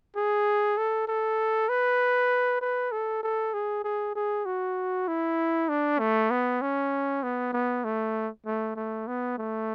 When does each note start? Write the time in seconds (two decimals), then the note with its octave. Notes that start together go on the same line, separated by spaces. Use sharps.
0.16 G#4
0.77 A4
1.08 A4
1.69 B4
2.61 B4
2.92 A4
3.23 A4
3.53 G#4
3.84 G#4
4.15 G#4
4.45 F#4
5.08 E4
5.69 D4
5.99 A3
6.30 B3
6.62 C#4
7.23 B3
7.53 B3
7.84 A3
8.46 A3
8.76 A3
9.07 B3
9.38 A3